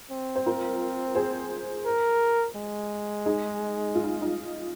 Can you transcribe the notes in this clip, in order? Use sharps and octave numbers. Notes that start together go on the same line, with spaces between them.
C4
C5
F4 A#4
G#4 C5
A#4
G#3
D#4 G#4
F4
D#4
D#4